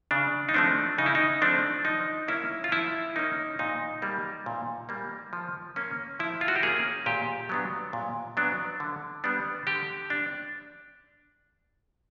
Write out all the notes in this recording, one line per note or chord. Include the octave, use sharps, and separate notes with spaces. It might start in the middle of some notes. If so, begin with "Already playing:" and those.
C#3 D4
D#4
F3 A3 C4 D4
C#3 D#4
E4
D#4
F3 A3 C4 D4
F3 D#4
A#3 C#4 E4
F4
F3 E4
A#3 C#4 D#4
A#2 D#4
G3 A#3
A#2
G3 A#3
F3
A#3 C#4
F3 E4
F4
F#4
G4
A#3 C#4 G#4
A#2 G4
F#3 B3 D4
A#2
F#3 B3 D4
D3
G3 B3 D4
D3 G4
D4